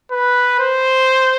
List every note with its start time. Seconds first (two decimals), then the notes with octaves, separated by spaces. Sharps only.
0.11 B4
0.59 C5